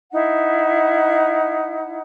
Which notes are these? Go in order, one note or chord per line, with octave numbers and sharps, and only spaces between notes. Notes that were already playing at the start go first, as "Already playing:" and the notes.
D#4 E4 F#5